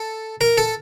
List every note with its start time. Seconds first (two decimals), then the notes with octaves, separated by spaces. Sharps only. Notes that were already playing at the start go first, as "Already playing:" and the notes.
Already playing: A4
0.41 A#4
0.58 A4